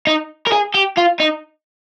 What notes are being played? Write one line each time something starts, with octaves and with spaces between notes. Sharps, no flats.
D#4
A#4
G#4
G4
F4
D#4